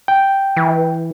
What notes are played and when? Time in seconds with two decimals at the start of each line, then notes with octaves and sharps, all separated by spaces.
0.08 G5
0.57 E3